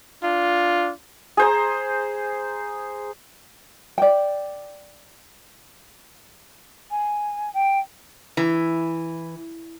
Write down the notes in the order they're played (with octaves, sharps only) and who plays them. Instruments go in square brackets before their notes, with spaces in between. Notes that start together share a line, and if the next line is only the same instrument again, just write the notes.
[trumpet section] D4 F4
[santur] G#4 C5 A#5
[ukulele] D5 G5
[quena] G#5
G5
[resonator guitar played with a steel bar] E3